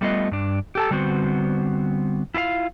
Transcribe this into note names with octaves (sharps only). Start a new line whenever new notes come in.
G3 A3 B3 F4 D#5
G2 D4
G4 A4 A5
D3 G3 B3 C4 F#4 C5
E4 F4 A#4 F5